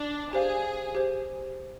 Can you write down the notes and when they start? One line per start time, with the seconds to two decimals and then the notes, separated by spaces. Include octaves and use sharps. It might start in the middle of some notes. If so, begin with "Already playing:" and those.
Already playing: D4
0.33 G4 G#4 C5 F5
0.95 G4 C5